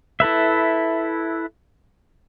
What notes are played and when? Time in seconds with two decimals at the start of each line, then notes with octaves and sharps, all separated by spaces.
0.20 E4 A4 B4 E5